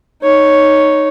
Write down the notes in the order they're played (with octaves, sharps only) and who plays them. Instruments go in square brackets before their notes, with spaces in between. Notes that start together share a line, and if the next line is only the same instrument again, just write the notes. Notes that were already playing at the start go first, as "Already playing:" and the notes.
[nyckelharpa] D#4 C#5